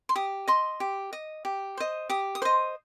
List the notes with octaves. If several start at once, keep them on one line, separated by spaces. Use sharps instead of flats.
C6
G4 D#6
D#5 C6
G4
D#5
G4
C5 D#5
G4 D#6
D#6
C5 D#5 C6